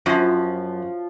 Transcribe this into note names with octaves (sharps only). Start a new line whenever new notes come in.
F#2 F3